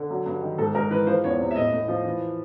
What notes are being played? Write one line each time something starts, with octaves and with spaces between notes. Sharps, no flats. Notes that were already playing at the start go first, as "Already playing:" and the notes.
Already playing: D3
F#3
G2
D#3
G#2 A4
G#2 A#4
E3 B4
F3 C5
E2 C#5
C3
E5
A2 D#5
A2
F3
E3